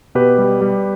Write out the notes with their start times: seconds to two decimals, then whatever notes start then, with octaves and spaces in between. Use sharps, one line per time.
0.15 B2 G4 B4
0.38 G3
0.61 G3